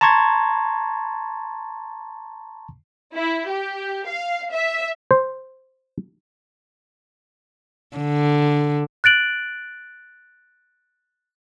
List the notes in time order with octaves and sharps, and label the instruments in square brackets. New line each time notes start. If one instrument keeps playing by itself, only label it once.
[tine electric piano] A5 A#5 C6 C#6 G#6 A6
[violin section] E4
G4
F5
E5
[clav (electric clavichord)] C5
[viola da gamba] D3
[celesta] F#6 A6 D7 F#7